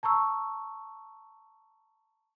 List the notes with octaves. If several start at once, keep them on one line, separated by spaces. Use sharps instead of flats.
A5 A#5 C#6 E6